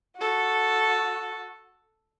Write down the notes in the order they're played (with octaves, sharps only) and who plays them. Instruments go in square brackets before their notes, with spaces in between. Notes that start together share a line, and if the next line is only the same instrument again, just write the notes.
[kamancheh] F#4 A4